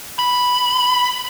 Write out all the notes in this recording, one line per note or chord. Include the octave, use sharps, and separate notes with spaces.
B5